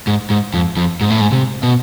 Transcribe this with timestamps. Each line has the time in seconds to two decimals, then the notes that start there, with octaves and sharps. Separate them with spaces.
0.07 G#2
0.30 G#2
0.54 F2
0.77 F2
1.01 G#2
1.10 A2
1.21 G#2
1.32 C3
1.63 B2